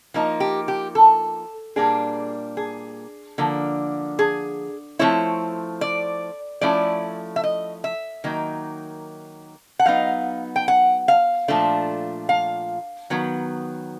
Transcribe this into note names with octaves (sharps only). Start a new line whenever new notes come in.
F3 A#3 D#4
G4
G4
A4
A#2 G3 A#3 D4 G#4
G#4
D3 F3 A#3
G#4
F3 A3 C4 E4 C#5
D5
F3 A3 C#4 E4 D5
E5
D#5
E5
D#3 F#3 A#3 D#4
F#5
F#3 B3 D#4 F5
G5
F#5
F5
A#2 F3 A3 D4
F5
D#3 F#3 B3